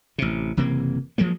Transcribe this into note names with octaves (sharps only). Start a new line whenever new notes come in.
A1 C3
F#1 C3 E3 A#3
F3 F#3 G#3 A#3